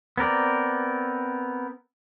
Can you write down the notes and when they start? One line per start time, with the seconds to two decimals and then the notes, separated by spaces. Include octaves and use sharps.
0.18 B3 C4 A#4 D5